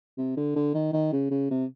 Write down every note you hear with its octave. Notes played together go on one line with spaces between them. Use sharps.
C3
D3
D3
D#3
D#3
C#3
C#3
C3